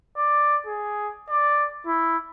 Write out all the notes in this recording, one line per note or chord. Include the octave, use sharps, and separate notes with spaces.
D5
G#4
D5
E4